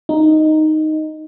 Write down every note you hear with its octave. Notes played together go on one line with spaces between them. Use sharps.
D#4